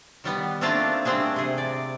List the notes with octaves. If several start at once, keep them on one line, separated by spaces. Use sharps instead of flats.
D#3 G3 B3
A3 A#3 C4 D4 F4 D5
G3 A3 C4 D4 G#4
C3 G#4
D5